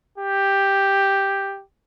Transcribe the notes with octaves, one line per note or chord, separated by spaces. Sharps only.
G4